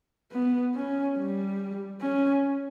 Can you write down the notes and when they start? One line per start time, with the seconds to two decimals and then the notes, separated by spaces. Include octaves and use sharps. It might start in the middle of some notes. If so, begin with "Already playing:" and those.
0.32 B3
0.75 C#4
1.17 G3
2.01 C#4